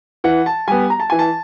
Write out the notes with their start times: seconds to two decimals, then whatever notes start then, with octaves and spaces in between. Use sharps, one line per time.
0.24 E3 F#5
0.46 A5
0.68 G3 B3 G#5
0.90 A#5
1.00 A5
1.10 E3 G#5
1.19 A5